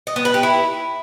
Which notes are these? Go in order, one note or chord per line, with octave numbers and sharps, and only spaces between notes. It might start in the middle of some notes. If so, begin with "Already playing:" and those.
D#5
B3
B4
G4
E4